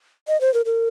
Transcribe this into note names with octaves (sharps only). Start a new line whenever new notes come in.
D#5
C5
A#4
A#4